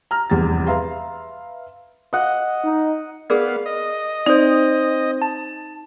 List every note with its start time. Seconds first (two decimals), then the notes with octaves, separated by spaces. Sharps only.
0.11 A#5 F6
0.30 F1 E2 G2 C3 A6
0.67 B4 E5 F5 A#5 C6
2.13 D#5 F#5
2.64 D#4
3.30 B3 G#4 A#4 D5 F5
3.66 D#5
4.26 C4 D#4 C5 D5
5.22 A5